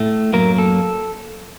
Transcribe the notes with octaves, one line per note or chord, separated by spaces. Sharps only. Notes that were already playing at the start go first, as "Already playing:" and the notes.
Already playing: A2 A3
F#2 F#3 A#3 A#4
A4